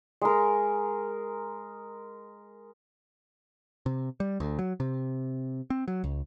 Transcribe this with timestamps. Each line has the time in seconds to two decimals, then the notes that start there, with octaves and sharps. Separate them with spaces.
0.22 G#3 A#4
3.86 C3
4.20 G3
4.40 D2
4.59 F#3
4.80 C3
5.70 C4
5.88 F#3
6.04 C#2